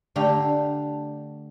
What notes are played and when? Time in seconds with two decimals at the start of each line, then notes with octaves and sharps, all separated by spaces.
0.16 D3 A3 G4 F5 A#5